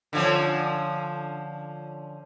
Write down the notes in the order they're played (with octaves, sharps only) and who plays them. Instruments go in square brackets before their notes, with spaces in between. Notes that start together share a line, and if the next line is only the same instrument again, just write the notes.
[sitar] D3 F3 C#4